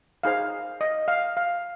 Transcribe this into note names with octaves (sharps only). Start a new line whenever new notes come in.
D#4 G#4 C5 F5
D#5
F5
F5